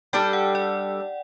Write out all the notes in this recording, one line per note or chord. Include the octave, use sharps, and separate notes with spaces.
G3 D4 A4 G5
F#5
D5